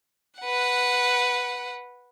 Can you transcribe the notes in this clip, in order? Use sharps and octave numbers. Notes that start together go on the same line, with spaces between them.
B4 F#5